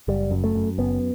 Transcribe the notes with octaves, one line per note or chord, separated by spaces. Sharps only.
F#1 G3
F#2
A3
F#2
F#1 B3